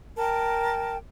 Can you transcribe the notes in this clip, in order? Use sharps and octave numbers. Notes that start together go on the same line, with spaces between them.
A#4 G5 A5